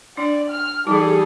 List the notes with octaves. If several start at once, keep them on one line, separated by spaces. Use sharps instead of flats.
D4 D5
F6
E3 G3 D#4 G#4 A4